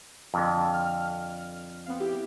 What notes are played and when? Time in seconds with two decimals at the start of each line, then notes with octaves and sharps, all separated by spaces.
0.34 F2 D3
0.74 F6
1.86 B3 C4 F5
2.00 E4 G4